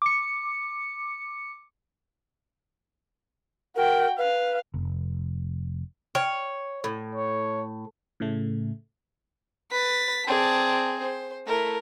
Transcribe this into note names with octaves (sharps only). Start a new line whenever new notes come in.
D6 C#7
F#4 A#4 G5
B4 F5
F1
C#5 G5 F6
A2
C#5
A2 C#3 A3
B4 A6 B6
C4 G#4 D5 A5
C5
A3 E4 A#4